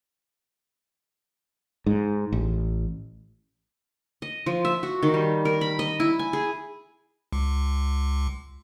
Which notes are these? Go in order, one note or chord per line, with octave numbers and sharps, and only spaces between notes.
G#2
A1
D#5
F3
E5
F#4
D#3
G3
A#4
B5
D#5
E4
G#5
G#4
C#2